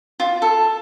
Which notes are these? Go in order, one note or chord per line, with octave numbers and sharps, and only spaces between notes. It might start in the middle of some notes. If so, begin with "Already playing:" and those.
F4
A4